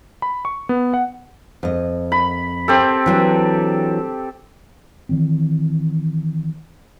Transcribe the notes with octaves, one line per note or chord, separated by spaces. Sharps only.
B5
C#6
B3
F#5
F2 D#5
B5
C4 G4 A4
E3 F#3 D4
D#3 E3 C4